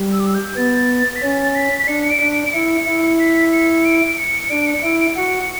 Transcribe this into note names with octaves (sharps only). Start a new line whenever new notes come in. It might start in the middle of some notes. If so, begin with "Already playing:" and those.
Already playing: G3
E6
D6
E6
G6
B3 A6
B6
C#4 A6
B6
B6
D4 C#7
C#7
D7
D4
D7
D7
E4 C#7
E4
B6
C#7
D7
C#7
D4 D7
C#7
E4 D7
D7
F#4 C#7